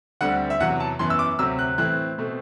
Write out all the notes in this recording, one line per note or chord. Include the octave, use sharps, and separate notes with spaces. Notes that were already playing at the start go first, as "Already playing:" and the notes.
D2 D3 G3 C4 F#5
E5
E2 C3 F#3 F#5
A5
F#2 E3 B3 C6
E6
D6
D2 C3 F#3 C4 E6
F#6
A2 E3 A3 C4 F#6
B2 A3 C4